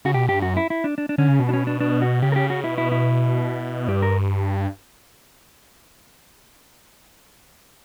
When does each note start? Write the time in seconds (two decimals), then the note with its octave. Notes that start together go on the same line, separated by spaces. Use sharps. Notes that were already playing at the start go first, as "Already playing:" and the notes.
0.05 C#3 F#4
0.14 B2 G4
0.29 G2 G4
0.42 F#2 F#4
0.57 E4
0.70 E4
0.84 D4
0.98 D4
1.09 D4
1.18 D3 C#4
1.29 C#3
1.39 B2
1.49 D4
1.53 C#4
1.67 D4
1.80 D4
2.02 F#4
2.22 C#3 G4
2.32 A#4
2.36 G4
2.50 F#4
2.64 B2 E4
2.78 E4
2.92 E4
3.88 G2 G4
4.02 A#4